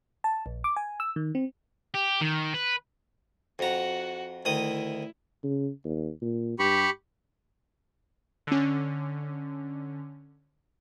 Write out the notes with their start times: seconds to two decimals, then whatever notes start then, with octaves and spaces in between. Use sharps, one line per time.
0.24 A5
0.46 A#1
0.64 D6
0.76 G#5
1.00 E6
1.16 D#3
1.35 C4
1.94 G4
2.21 D#3
2.54 B4
3.59 F2 F#4 F#5 A#5
4.45 D2 D#3 E4 D#6
5.44 C#3
5.85 D#2
6.22 A#2
6.59 G2 G4 B5 C#6
8.47 D3 C#4